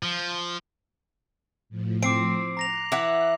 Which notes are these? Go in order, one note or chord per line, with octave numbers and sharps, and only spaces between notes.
F3
A2 F3
C4 D6 C7 D7
A#5 F#6 A#6 F7
E3 E5 F#5 D6